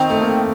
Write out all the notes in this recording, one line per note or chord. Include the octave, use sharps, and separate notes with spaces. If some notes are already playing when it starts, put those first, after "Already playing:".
Already playing: D#3 C4
A3
A#3